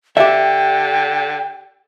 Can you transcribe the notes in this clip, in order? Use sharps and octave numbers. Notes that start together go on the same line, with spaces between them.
D3 G4 E5 G5